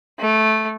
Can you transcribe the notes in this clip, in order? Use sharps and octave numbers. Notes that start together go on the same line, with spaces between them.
A3